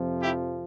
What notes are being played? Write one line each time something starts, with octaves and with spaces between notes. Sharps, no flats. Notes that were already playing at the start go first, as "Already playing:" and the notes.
Already playing: F2 C3 F3
E4 G4